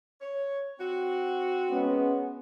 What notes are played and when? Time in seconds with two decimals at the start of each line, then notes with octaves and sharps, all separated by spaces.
0.21 C#5
0.79 C4 F#4
1.70 G#3 B3 C#4